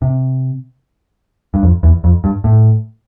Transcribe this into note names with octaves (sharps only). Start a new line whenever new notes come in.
C3
G2
F2
E2
F2
G2
A2